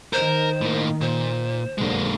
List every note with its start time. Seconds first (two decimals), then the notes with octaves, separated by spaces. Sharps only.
0.13 D#3 A#4 C5
0.61 A2 A#3
1.01 A#2 C5
1.78 B1 F#2 D3 G#3 A#3